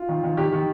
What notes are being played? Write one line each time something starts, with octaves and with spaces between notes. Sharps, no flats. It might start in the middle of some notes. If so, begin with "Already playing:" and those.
Already playing: F4
D#3
D#3
D#3 G4
D#3